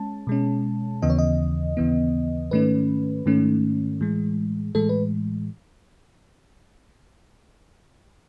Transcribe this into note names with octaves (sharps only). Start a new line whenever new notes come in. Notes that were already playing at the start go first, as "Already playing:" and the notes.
Already playing: G#3 C#4 A5
B2 G#3 C#4
D#2 C#3 E3 B3 D#5
C#5
D#5
D#2 C#3 E3 B3
G#2 D#3 A3 C#4 B4
G#2 D#3 A3 C#4
A2 E3 G#3
A2 E3 G#3 A4
B4